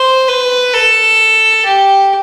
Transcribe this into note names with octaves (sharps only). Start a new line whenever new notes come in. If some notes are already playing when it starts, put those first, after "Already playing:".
Already playing: C5
B4
A4
G4